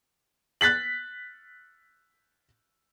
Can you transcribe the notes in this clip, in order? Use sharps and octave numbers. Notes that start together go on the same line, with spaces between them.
F#6 A6 B6 F#7